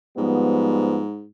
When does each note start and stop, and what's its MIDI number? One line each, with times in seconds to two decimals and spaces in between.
0.18 1.26 44
0.18 1.02 53
0.18 1.02 55
0.18 1.02 59